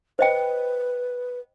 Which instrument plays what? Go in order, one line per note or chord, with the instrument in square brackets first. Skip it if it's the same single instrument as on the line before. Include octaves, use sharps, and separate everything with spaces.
[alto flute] B4 [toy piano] C5 D#5 G5